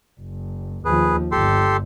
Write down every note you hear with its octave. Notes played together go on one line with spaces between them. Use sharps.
F#1
D#2 F3 G#4 B4
G1 G4 A4 C6